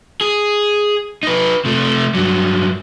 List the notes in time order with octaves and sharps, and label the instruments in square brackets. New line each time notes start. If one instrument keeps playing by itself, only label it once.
[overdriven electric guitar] G#4
D#4 B4
C3 A3
G2 F#3